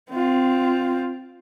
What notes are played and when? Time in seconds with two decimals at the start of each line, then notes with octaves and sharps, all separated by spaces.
0.10 C4 F4